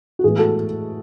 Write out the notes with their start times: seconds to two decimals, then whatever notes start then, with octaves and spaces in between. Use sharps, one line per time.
0.19 F#4
0.24 A2 E3 G#3 B3 G#4
0.38 F#4 A4